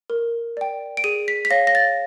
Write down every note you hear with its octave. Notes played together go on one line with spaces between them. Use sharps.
A#4
D5 G5
D7
G#4 D#7
B6
B6
C#5 F5 A#6
A#6
A6